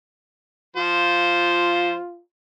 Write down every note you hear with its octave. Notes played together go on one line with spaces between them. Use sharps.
F3 F4 C5